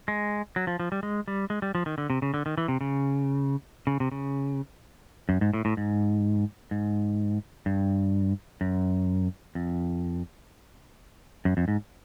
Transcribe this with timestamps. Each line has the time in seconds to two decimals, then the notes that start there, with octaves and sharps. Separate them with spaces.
0.08 G#3
0.56 F#3
0.67 F3
0.80 F3
0.92 G3
1.03 G#3
1.28 G3
1.50 G#3
1.62 G3
1.75 F3
1.86 D#3
1.98 D3
2.10 C3
2.22 C#3
2.34 D3
2.46 D#3
2.58 E3
2.68 C3
2.81 C#3
3.87 C#3
4.00 C3
4.12 C#3
5.29 F#2
5.41 G#2
5.54 A2
5.65 A2
5.77 G#2
6.71 G#2
7.66 G2
8.61 F#2
9.55 F2
11.45 F#2
11.57 F2
11.68 G#2